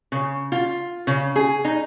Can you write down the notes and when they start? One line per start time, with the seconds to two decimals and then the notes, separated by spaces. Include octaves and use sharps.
0.12 C#3
0.52 F4
1.07 C#3
1.36 G#4
1.65 D#4